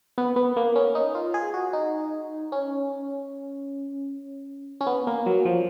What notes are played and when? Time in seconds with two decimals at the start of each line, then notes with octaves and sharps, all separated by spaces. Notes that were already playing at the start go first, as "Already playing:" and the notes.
0.18 B3
0.36 B3
0.56 A#3
0.76 C#4
0.95 D#4
1.15 F4
1.34 G#4
1.54 F#4
1.73 D#4
2.52 C#4
4.81 C#4
4.87 B3
5.07 A#3
5.26 F#3
5.45 F3